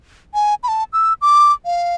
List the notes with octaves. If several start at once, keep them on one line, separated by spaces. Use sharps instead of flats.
G#5
B5
A5
E6
D6
F5